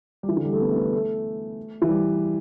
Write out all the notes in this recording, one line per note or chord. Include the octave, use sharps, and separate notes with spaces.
G3
E3
D3
G3
A3
B3
A3
B3
A3
E3
G3